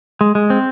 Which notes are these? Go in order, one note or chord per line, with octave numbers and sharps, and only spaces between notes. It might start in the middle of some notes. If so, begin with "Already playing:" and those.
G#3
G#3
C4